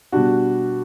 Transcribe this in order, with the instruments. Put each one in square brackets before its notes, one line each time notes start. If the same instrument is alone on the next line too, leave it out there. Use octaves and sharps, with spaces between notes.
[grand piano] B2 G3 D4 F#4